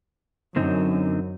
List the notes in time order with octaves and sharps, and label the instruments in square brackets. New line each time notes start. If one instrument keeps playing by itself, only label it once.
[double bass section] F#2 [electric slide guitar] D3 C4 D#4